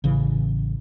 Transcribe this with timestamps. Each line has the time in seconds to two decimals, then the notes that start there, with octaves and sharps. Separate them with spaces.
0.04 A1 C#3 E3